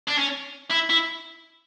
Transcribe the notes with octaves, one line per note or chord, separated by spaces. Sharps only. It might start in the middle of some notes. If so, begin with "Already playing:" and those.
D4
C#4
E4
E4